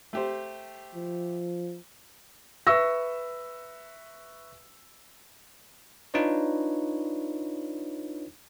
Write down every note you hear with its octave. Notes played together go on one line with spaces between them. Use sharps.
A3 G4 C5
F3
B4 E5 C#6 E6 A#6
D4 D#4 F4 B4 C#5